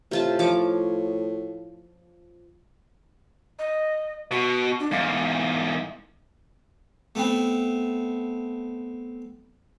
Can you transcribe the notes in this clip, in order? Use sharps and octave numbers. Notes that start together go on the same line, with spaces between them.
A2 C3 F4 A5
F3 C#5 D6
D#5
B2 F#4
D4
E2 G#2 F5
A3 B3 C4